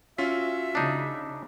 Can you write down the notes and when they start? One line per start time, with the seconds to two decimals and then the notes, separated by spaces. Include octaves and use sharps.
0.18 C#4 F4 F#4 E5 B6
0.75 C#3 D4 D#4